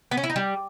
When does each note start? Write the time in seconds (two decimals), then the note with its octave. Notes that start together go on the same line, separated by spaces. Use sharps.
0.11 B3
0.17 C#4
0.24 E4
0.30 D#4
0.36 G3